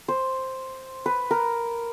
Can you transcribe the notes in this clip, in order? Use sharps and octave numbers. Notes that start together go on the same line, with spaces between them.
C5
B4
A#4